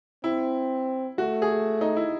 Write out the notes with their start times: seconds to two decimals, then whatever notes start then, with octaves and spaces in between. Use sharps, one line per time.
0.24 C4 E4
1.18 A3 F#4
1.42 G#4
1.81 D#4
1.96 E4